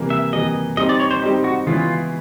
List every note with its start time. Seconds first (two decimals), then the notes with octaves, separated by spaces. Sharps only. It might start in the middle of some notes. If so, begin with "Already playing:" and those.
Already playing: C3 E3 G3 A#3
0.10 E5
0.33 C3 E3 G3 A#3 D#5
0.77 G3 C4 D#4 D#5
0.89 D5
1.00 C#5
1.11 C5
1.22 G3 C4 D#4 G4
1.44 F#4
1.66 C#3 E3 G#3 B3 E4 F4